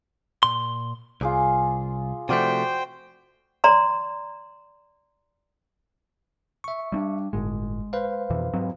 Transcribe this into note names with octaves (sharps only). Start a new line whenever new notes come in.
A#2 C6
C2 F4 G#4 D6
C3 F3 A3 F#4 C5 D5 G5
D5 A#5 C6
E5 C#6
G3 C#4 D4
G1 A2 G#3
B4 C5 F5
F2 B2 E3
G#2 F#3 C4